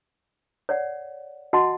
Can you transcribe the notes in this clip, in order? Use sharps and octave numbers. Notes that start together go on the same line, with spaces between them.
C#5 D5 F#5
F#4 D#5 F#5 A5 C6